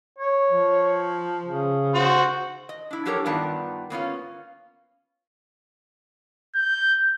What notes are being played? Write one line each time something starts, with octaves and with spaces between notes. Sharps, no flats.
C#5
F3
C#3
F#4 C5
D#5
D4 E4
F#3 D4 G4 A4 A#4 C#5
G2 D#3 B3 F4 D5 A5
A#3 B3 C#4 F4
G6